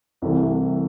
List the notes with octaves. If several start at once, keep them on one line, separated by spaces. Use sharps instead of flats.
C2 C3 E3 A3